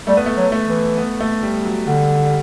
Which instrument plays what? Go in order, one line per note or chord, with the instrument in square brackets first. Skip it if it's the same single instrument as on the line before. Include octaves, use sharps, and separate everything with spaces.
[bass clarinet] G3 [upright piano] A3
[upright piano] B3
A3
[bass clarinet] F#3
[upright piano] A3
[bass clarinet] E3
[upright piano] B3
A3
G3
F#3
[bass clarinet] D3 [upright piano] G3
[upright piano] G3